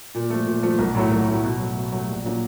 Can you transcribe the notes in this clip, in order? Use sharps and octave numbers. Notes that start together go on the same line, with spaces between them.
A#2
F3 A3
A#2
F3 A3
B1
A2 F#3 A3
B1
A2 F#3 A3
B2
F#3 A3
B2
F#3 A3
A#1
A#2 F#3 A#3 D4